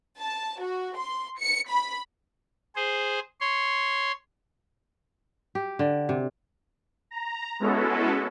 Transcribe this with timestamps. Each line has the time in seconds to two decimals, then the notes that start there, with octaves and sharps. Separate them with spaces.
0.19 A5
0.60 F#4
0.97 C6
1.39 C#7
1.69 B5
2.76 G#4 C5
3.41 C#5 C6
5.55 G4
5.79 D3
6.09 C3
7.11 A#5
7.60 G#3 B3 C#4 E4 F#4 A4